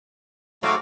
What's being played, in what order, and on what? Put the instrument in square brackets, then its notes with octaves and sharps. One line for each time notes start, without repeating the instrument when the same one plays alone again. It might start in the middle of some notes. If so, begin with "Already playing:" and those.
[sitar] G#2 F#3 [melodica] A3 F#4 F5